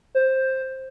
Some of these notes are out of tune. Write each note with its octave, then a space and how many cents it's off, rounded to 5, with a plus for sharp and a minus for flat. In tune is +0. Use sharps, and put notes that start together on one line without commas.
C5 +10